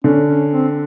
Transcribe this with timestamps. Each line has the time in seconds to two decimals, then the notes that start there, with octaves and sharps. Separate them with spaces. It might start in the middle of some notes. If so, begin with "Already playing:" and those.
0.04 D3 C#4
0.27 C#4
0.51 C4